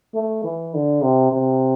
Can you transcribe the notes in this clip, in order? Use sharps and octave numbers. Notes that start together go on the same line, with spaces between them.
A3
E3
D3
C3
C3